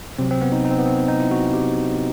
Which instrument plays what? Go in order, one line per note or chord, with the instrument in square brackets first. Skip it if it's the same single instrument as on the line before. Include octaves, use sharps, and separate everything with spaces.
[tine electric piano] C3 F#3 C4
C4
B3
D#4
D#4
C4
B3
C4
D#4
E4
F#4
G4